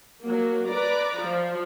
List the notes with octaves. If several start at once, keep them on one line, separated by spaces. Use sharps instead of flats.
F#3 A#3
B4 D5 A#5 D6
F3